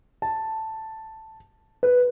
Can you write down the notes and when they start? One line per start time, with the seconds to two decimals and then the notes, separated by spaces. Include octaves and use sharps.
0.22 A5
1.83 B4